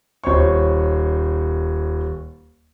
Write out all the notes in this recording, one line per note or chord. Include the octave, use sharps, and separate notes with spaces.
D#1 C5 C#5 C#6